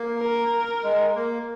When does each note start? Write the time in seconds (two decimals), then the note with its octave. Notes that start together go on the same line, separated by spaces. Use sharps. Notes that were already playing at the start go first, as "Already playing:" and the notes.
Already playing: A#3
0.19 A#4
0.83 G#3
1.16 A#3